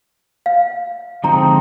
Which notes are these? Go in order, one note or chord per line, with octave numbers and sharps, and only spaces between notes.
F5
D3 F3 G#3 C4 D#4 A#5